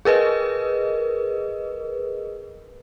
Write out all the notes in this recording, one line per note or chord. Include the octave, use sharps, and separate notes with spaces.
G#4 A#4 B4 D#5